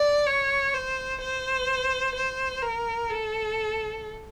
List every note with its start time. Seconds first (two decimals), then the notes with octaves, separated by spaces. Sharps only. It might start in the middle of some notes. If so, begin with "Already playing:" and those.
Already playing: D5
0.26 C#5
0.74 C5
1.21 C5
2.15 C5
2.62 A#4
3.09 A4